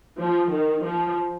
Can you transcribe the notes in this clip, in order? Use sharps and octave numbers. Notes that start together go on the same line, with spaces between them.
F3
D#3
F3